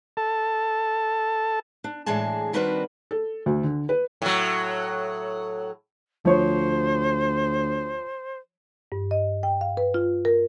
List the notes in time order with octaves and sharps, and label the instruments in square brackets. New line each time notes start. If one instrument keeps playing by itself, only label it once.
[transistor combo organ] A4 A5
[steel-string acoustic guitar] D4
A2 E3 G#3 D4 G#4 A5
D#3 G3 C4 D4 F#4 B4
[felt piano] A4
D2
D3
B4
[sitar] A2 F#3
[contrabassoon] D2 [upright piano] F3 C#5 C#6 [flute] C5
[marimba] G2
D#5
G5
F5
B4
F4
A#4